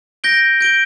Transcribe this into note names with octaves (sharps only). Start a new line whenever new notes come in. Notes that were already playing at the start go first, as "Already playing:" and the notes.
G6 A#6 D7 G7
G6 D7 G7